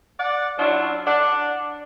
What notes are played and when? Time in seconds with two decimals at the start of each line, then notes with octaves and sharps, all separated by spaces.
0.20 D5 F#5
0.58 F#3 C#4 D4 E4 F4
1.06 D4 F#5